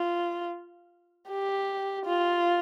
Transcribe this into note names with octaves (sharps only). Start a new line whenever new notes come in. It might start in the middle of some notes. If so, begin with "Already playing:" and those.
Already playing: F4
G4
F4